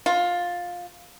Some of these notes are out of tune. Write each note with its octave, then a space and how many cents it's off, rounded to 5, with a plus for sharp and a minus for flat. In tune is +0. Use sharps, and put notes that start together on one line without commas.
F4 +15